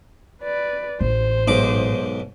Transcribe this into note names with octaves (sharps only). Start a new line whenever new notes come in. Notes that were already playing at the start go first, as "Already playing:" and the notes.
B4 D5
A1 C5
B1 G#2 D6